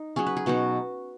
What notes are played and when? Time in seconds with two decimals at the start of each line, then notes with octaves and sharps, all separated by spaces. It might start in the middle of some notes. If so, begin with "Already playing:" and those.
Already playing: D#4
0.16 F#3 C#4 G#4
0.27 B4
0.37 G#4
0.46 B2 F#3 D#4 F#4